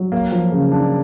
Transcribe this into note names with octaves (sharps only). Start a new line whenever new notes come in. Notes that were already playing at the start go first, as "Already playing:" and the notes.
Already playing: F#3
A#3
F3
C#3
D4